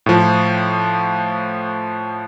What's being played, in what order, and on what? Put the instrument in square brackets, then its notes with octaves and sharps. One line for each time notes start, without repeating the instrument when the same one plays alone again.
[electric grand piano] A2 F3